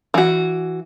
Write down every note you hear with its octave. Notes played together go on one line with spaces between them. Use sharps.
E3 F#4